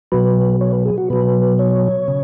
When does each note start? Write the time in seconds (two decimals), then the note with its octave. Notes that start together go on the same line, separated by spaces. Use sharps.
0.12 B2 F#3 B4
0.61 C#5
0.73 B4
0.85 G#4
0.98 F#4
1.10 B2 F#3 B4
1.59 C#5
2.08 C#3